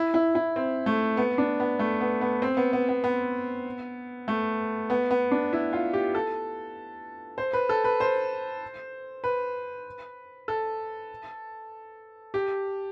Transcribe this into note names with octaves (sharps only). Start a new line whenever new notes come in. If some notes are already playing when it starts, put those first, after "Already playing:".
Already playing: E4
E4
E4
C4
A3
B3
D4
B3
A3
B3
B3
C4
B3
B3
B3
B3
A3
B3
B3
D4
E4
F4
G4
A4
C5
B4
A4
B4
C5
B4
A4
G4